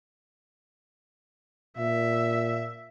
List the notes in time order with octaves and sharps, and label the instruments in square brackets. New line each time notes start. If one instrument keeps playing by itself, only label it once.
[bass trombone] A#2 [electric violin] E5